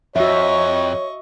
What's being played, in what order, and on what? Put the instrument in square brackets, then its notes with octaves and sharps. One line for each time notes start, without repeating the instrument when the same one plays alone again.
[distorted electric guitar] F2 [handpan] F#4 E5 [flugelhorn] C#5 [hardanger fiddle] D#5 C#6